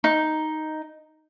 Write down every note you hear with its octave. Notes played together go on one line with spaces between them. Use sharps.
D#4